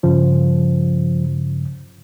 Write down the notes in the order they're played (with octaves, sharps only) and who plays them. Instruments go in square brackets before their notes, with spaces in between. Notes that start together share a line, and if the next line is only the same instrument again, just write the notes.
[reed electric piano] G2 C#3 [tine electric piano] F3